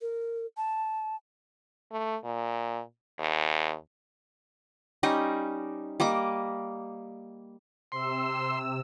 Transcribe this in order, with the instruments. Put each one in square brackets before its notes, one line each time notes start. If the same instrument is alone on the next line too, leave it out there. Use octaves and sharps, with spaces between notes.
[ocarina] A#4
A5
[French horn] A3
A#2
D#2
[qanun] G3 C#4 D#4 D#5
G3 A#3 D#5 D6
[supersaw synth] C3 E6 [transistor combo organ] C6